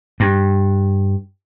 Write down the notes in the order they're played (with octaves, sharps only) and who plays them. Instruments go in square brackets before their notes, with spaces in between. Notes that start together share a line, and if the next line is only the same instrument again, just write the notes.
[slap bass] G2